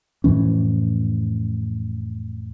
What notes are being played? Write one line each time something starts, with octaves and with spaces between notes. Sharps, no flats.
F2 A2 E3 C#4